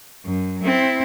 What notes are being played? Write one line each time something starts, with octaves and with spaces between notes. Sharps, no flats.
F#2
C4 E4